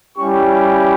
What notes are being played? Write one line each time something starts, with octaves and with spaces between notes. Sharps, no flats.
G3 C#4 E4 G4 C#6